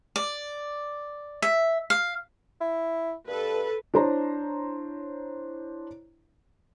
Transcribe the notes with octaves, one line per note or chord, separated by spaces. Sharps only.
D5
E5
F5
E4
G2 A4 B4
D4 E4 C5 C#5 A#5